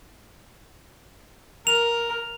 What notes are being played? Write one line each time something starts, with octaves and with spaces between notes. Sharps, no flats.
A#4 F7